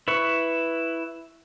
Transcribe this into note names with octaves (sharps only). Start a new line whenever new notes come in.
E4 B4 B5 C#6